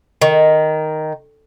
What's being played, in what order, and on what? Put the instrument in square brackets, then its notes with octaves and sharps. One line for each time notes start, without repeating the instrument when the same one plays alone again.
[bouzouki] D#3